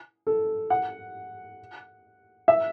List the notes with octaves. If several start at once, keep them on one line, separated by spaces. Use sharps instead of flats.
A4
F#5
E5